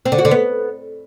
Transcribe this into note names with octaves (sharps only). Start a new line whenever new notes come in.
C4
D3
F#4
D3
B3